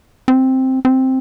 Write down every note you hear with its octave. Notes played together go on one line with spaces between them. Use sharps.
C4
C4